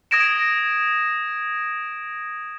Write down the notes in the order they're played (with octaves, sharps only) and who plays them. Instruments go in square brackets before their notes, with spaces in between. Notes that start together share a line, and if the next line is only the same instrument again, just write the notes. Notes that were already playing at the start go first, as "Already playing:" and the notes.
[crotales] D#6 G#6 A#6 D7 E7